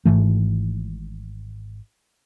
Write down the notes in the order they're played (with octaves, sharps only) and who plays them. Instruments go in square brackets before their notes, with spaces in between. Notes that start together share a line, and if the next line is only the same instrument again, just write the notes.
[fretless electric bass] G#1 G#2 E3 A3